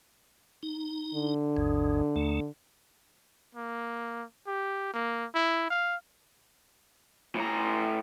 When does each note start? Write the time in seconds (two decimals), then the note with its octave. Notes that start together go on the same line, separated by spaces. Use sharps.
0.63 D#4
1.14 D3
1.57 G#1 D#2 G#2
2.16 D#2 A3
3.55 A#3
4.47 G4
4.94 A#3
5.34 E4
5.70 F5
7.35 A2 A#5